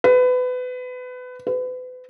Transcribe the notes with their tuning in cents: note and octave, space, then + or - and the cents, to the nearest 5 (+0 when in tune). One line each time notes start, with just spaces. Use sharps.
B4 +25
B4 +35